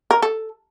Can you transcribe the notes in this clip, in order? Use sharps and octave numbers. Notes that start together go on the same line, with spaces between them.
A#4
A4